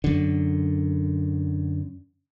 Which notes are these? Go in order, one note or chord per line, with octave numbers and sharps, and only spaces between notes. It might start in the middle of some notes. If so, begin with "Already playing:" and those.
F#2 D3